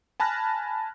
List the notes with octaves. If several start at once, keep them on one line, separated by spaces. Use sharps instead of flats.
G#5 A5 B5 F6 F#6 A#6